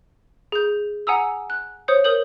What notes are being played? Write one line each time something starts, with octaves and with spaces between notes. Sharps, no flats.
G#4 G6
F#5 G#5 A#5 D#6 E6
F#6
C5 C#5 D#6 G6 C#7
A#4 D#6 G6 F#7